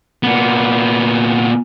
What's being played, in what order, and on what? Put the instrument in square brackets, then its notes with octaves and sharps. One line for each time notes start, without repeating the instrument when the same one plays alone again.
[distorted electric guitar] A#2 B3